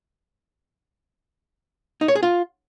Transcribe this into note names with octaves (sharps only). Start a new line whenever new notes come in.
D#4
C#5
G#4
F4